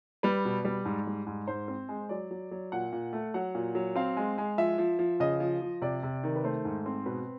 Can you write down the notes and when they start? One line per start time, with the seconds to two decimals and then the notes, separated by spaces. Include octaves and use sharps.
0.23 G3 B4
0.45 B2
0.65 G3
0.85 G#2
1.07 G3
1.27 G#2
1.47 G#2 C5
1.68 C4
1.89 G#3
2.09 F#3 D5
2.31 F#3
2.51 F#3
2.72 A#2 F#5
2.92 A#2
3.13 A3
3.34 F#3 F#5
3.55 A#2
3.75 F#3
3.95 C4 F5
4.17 G#3
4.38 G#3
4.58 F3 E5
4.78 F3
4.99 F3
5.20 C#3 D#5
5.40 F3
5.61 F3
5.82 C3 D5
6.03 C3
6.24 D#3
6.36 B4
6.44 A3 C5
6.65 G#2
6.86 C4
7.06 B2 B4